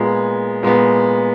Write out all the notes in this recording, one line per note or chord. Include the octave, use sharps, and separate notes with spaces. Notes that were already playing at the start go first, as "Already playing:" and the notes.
Already playing: A#2 G#3 B3
A#2 G#3 B3